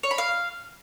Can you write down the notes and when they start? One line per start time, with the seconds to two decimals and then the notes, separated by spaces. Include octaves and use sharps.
0.03 C#5
0.11 B5
0.18 F5